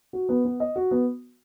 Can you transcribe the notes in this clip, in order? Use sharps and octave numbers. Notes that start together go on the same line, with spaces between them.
F#4
B3
B3
D#5
F#4
B3